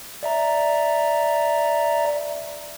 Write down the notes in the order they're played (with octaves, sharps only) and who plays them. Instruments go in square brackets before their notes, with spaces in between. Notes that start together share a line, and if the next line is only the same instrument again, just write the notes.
[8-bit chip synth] D5 E5 A#5